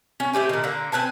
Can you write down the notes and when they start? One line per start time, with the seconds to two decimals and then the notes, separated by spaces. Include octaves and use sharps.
0.20 C#4
0.33 A3 C4 G4 G#5
0.49 A#2 D#3
0.64 D3 A#3
0.92 C4 B4 G#5 A5